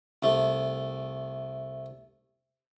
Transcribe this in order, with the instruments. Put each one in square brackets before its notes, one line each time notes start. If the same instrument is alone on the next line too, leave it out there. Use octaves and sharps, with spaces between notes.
[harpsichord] C2 A3